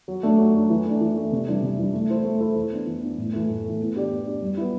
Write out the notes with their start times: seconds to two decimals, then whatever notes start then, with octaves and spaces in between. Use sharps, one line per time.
0.08 F#3
0.23 A3 D4
0.38 F#3
0.54 A3 D4
0.70 E3
0.85 A3 D4
1.01 E3
1.17 A3 D4
1.32 C3
1.48 E3 G3 D4
1.63 C3
1.79 E3 G3 D4
1.94 A3
2.10 E4 A4 C5
2.24 A3
2.40 E4 A4 C5
2.55 E3
2.71 B3 D4
2.86 E3
3.02 B3 D4
3.18 A2
3.33 E3 A3
3.49 A2
3.64 E3 A3
3.80 B3
3.95 D4 G4 D5
4.11 B3
4.26 D4 G4 D5
4.42 G3
4.57 B3 E4